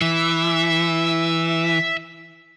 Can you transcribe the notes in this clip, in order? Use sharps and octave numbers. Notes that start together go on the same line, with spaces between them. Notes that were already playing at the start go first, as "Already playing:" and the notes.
E3 E5